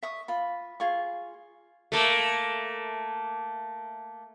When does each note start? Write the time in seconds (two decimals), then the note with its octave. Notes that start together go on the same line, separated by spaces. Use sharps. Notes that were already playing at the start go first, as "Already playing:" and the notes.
0.03 E5 C#6 D#6
0.28 F4 B5
0.80 F4 G#4 C#6
1.92 A3 A#3